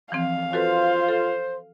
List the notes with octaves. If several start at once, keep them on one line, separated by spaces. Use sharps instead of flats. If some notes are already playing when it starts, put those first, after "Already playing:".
E3 F3 C4 F5
F4 F#4 A4 B4 C5
A4